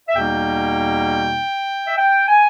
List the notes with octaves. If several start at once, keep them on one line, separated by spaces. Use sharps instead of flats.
E5
E2 B2 G3 A#3 D#4 G5
E5
G5
G#5